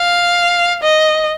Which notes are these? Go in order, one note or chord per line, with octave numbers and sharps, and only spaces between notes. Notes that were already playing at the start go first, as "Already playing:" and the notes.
Already playing: F5
D#5